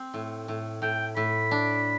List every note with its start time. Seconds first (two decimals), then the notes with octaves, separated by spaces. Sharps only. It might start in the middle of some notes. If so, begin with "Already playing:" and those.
Already playing: C4
0.14 A2
0.48 A2
0.82 A2 G5
1.16 A2 B5
1.51 D4